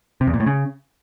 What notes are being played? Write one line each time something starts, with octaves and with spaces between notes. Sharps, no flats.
C3
E2
A#2
A2
C#3